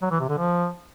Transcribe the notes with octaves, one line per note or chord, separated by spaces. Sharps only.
F#3
E3
C3
D3
F3